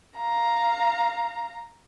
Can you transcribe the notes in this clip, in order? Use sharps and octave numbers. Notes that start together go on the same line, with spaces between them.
F5 A#5